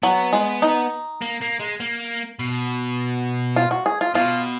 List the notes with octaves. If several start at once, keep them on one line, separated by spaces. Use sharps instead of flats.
F#3 B3
G#3
D#4
A#3
A#3
G#3
A#3
B2
F4
F#4
G#4
F4
B2 F4